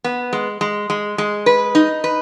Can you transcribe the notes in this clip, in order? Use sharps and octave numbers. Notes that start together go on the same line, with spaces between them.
B3
G#3
G#3
G#3
G#3
B4
D#4
B4